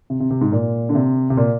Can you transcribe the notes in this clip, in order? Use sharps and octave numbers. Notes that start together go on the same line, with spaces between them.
C3
C3
C3
G#2
A#2
D3
C3
C3
A#2